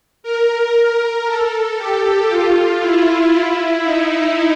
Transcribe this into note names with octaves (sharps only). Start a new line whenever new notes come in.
A#4
A#4
A4
G4
F4
E4
D#4